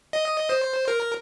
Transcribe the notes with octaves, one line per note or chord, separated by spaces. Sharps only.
D#5
C5
A#4